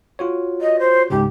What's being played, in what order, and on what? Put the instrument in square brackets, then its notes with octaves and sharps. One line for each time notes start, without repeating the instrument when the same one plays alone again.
[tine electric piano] F4 F#4 C#5
[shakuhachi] D#5
C5
[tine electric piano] C#2 G#2 C#3 [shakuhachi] G4